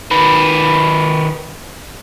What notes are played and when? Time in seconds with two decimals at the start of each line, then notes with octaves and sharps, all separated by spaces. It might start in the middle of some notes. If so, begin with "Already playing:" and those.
0.11 D#3 B4